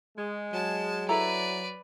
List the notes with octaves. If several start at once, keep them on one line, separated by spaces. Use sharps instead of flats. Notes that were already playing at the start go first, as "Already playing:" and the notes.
G#3
F#3 A5
E4 A4 B4 D5 A#5